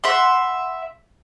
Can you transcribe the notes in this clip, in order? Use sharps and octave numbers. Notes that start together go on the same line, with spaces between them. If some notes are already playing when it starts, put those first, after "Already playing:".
E5 F#5 B5 C6